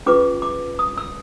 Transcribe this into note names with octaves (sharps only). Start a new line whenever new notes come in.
C#4 F4 G#4 B4 D6
D6
D#6
E6